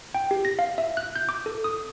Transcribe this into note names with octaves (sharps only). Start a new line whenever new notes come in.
G5
G4
A#6
F5
E5
F#6
G6
D6
A4
D#6